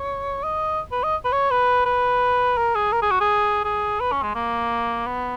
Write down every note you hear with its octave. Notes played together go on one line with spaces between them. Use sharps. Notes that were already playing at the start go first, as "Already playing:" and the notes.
Already playing: C#5
D#5
B4
D#5
B4
C#5
B4
B4
A#4
G#4
A#4
G#4
F#4
G#4
G#4
B4
C#4
G#3
A#3
B3